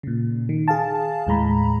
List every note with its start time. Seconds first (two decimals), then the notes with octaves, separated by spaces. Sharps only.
0.03 A#2 C#3
0.49 D#3
0.68 G#4 F5 A5
1.27 D#2 A2 G#3 A#5 B5